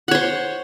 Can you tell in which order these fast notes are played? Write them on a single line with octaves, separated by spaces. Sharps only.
F#5 C#5 C5